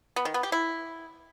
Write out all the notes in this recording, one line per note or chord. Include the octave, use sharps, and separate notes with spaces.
B3
D#3
B3
G4
E4